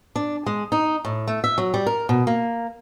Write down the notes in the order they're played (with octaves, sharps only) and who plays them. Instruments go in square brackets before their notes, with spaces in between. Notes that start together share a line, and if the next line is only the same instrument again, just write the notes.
[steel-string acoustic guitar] D4
G#3
D#4
A2
A3
E5
F#3
G3
A#4
B2
A#3